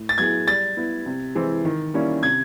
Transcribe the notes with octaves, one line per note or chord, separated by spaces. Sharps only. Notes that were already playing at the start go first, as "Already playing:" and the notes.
Already playing: A2
A6
F#3 B3 E4 G#4 G#6
G3 A6
B3 E4
C3
E3 G#3 C4
D#3
G3 A#3 C#4 E4
C3 G#6